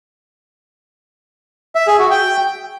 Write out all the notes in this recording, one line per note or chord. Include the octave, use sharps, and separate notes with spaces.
E5
G#4
F#4
G5